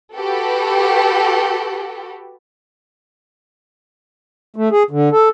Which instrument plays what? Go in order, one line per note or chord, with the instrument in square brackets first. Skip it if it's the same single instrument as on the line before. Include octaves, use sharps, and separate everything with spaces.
[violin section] F#4 G4 A4 B4
[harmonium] A3
G#4
D3
A4